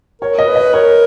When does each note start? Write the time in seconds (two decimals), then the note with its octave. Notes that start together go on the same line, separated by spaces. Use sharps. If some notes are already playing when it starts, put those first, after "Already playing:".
0.21 A#4 C#5
0.39 D#5
0.47 B4
0.56 D#5
0.73 A#4 C#5